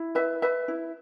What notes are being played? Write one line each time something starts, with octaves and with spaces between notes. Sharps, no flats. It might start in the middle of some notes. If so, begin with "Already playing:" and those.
Already playing: E4
B4 E5
B4 E5
E4